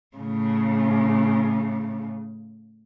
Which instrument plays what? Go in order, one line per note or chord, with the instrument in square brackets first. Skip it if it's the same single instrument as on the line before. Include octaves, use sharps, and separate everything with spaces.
[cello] A2 C#3